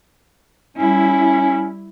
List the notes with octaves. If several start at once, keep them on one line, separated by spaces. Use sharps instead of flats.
G3 C#4 E4